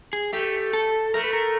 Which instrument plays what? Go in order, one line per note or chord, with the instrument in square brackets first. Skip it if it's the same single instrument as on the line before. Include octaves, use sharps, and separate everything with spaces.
[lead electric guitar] G#4
[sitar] A3 [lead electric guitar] G4
[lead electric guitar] A4
[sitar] A3 [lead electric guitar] A#4
[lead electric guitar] B4
A#4